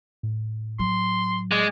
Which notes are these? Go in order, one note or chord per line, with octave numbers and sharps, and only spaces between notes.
A2
F#3 C6
G#3 D5